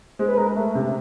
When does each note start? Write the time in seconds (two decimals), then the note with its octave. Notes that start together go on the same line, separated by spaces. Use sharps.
0.19 G#3 C5
0.29 B4
0.38 G#3 A#4
0.56 A3
0.75 C3